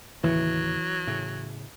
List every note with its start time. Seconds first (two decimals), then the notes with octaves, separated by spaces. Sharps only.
0.24 D#2 A2 C#3 E3 F#3
1.07 A2 C#3